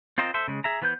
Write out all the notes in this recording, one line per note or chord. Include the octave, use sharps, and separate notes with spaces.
C4 F4 A#4 C5 D#5
A4 C5 E5
C#3 G#3
G#4 E5 A#5
E3 B3 B4 C5 G6